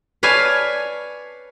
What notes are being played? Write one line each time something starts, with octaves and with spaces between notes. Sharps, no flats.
B4 C#5 D5 F5 G#5 A5